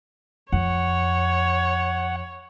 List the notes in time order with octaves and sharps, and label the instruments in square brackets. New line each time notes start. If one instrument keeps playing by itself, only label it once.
[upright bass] F2 [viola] C#5 [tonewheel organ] F#5